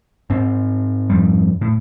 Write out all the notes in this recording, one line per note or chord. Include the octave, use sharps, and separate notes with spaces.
G#2 C4
F2 G3
A2